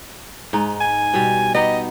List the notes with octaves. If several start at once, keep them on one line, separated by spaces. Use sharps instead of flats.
G#2 D#4
G#5
B2 G3
B3 D#4 G4 D#5